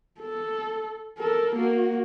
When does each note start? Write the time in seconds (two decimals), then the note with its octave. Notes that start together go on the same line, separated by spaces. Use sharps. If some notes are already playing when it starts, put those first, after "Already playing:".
0.20 A4
1.18 A4 A#4
1.56 A#3 F#4